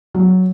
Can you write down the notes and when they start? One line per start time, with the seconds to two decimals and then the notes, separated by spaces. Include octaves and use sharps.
0.14 F#3